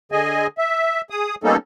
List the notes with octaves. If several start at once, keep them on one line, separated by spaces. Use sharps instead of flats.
D3 G#4 D#5 G#5
E5
G#4 D#6
G3 A#3 B3 C#4 D#4 A4